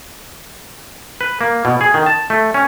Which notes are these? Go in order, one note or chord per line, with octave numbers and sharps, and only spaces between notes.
B4
A#3
B2
G#4
D#3
A5
A3
C#4